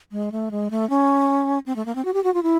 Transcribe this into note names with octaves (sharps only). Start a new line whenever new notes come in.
G#3
A3
G#3
A3
C#4
C4
A3
A#3
C4
F#4
G4
F#4
F4
E4